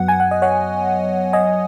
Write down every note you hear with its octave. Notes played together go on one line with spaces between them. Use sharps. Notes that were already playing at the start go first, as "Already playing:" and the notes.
Already playing: F#2 F#3 B3 F#5
G#5
F#5
D#5
C#5 F#5
D#5 G#5